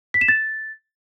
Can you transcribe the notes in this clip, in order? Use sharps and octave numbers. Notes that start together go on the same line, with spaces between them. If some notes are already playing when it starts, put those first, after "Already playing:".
B6
E7
A6